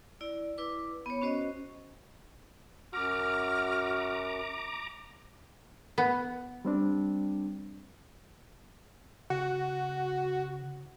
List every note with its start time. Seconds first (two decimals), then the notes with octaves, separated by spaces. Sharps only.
0.21 E4 D5
0.58 E4 B4 D6
1.06 B3 C#5
1.21 C#4 F#4 C5 D#5
2.93 F#2 F#4 A#5 D6 F6
5.98 B3
6.65 G3 C4 D4
9.30 C#3 F#4